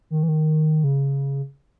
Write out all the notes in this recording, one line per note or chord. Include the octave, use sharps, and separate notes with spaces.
D#3
E3
D#3
C#3